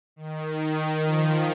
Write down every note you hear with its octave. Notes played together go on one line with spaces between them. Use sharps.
D#3
F3